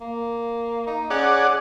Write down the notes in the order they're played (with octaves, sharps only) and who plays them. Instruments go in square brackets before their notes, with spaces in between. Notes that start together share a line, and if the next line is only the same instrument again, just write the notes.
[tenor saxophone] A#3
D#4
[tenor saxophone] C#4 [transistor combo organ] G#4 D5 F#5